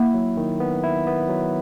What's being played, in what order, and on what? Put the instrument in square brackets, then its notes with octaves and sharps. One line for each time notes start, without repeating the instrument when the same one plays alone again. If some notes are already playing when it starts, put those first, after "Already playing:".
Already playing: [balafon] A#3 [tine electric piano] E4
[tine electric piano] F#3
D#3
B3
E4
B3
F#3